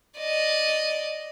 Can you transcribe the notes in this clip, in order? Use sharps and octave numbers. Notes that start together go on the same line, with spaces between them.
D5 D#5